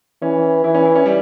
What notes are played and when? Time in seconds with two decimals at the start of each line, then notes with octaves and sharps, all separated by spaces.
0.22 E3 C#4
0.64 E3 E4
0.75 C#4
0.85 E4
0.96 C#4
1.06 G3